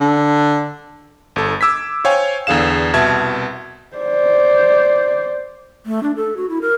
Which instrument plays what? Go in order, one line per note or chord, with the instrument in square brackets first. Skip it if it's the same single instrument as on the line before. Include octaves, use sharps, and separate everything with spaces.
[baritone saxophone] D3
[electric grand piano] G1 A4
D6 E6 G#6 B6
C5 C#5 F5 G5 G#5
E2 D3 G#4 F5 E7
C2 B2 E5 A5 G#6
[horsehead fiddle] C5 D5
[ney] A3
D4
A4
F#4
E4
A#4